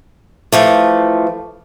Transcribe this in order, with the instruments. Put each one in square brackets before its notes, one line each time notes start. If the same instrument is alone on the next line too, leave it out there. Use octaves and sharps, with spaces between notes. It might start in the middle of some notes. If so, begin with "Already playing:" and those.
[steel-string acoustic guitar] E3 F3 A3